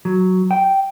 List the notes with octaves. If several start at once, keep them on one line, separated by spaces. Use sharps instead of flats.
F#3
G5